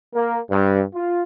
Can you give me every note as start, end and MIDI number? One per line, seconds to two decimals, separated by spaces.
0.14 0.38 58
0.50 0.80 43
0.94 1.23 65